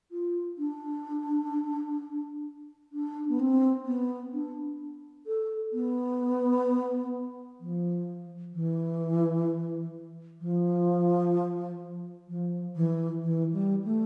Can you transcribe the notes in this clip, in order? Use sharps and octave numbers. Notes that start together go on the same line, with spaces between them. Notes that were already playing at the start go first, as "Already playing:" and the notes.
F4
D4
D4
B3
C4
B3
D4
A4
B3
F3
E3
F3
F3
E3
E3
G3
A3